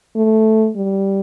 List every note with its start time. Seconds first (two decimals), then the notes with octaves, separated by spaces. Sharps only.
0.16 A3
0.76 G3